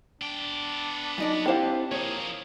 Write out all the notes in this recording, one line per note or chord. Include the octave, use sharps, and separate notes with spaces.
B3 D4 G5
F#2 D#4 D5
C4 E4 G4 C5 F5
F3 A#3 G#4 C#5